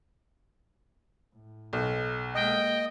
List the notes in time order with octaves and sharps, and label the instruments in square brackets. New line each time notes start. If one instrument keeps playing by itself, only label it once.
[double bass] A2
[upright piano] B1
[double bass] G#3 A#3 [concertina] D#5 [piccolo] G5